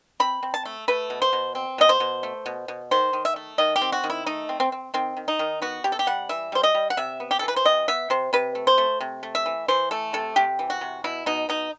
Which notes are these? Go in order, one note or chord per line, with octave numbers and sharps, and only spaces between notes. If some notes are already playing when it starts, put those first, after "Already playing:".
C4 B5
C4
A5
A3
A3 B4
B2
C5
B2
C4
B2 D#5
C5
B2
A3
B2
B2
D#3 C5
D#3
E5
A3
D#3 D#5
G4
C4
F#4
D#3
E4
A3 D#4
C4
C4
C4
D#3 C4
D#3
D#4
D#3
B3 F#4
C3 G4
A4
G4
G3 F#5
E3 E5
G3 C5
D#5
G3
F#5
C3 E5
B3
G4
E3 A4
B4
C5
C3 D#5
B3 E5
C3 C5
C3 B4
A3
C5
A3
C3
A3
E5
E3
E3 C5
A3 A4
C3 A4
C3 G4
E3
F#4
C3
B2 E4
B2 D#4
B2 D#4